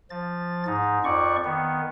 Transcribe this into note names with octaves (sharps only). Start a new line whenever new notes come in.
F3 A6
G#2 D#4
F2 D5 C#6
D#3 B3